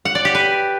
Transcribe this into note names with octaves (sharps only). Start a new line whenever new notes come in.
F#5
D5
G4
B4